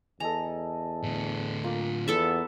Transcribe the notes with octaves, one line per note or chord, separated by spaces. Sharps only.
E2 A4 D#5 G#5 A#5
A2 D3
A#3 F4
E2 B3 A4 E5